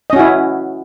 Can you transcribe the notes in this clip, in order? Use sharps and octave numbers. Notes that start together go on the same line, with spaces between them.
C#4 E4 F#4 D#5